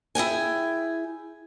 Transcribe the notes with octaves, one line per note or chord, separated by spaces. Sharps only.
E4 G#4 G5 G#5